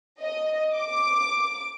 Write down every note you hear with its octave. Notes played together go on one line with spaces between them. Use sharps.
D#5
D6